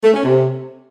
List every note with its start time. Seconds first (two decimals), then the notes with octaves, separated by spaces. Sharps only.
0.03 A3
0.13 C#4
0.24 C3